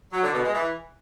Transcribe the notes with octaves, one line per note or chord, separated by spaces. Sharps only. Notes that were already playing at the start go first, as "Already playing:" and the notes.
F#3
D3
B2
G#3
E3